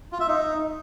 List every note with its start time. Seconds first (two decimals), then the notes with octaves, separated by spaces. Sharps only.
0.12 F4
0.20 E5
0.28 D#4